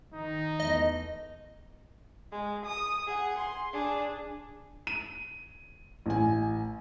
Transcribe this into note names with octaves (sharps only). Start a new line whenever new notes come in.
D#3 D#4
E2 A3 D#5
G#3
D#6
G#4 F#5
C6
D4 G#4
D#7
A1 G#5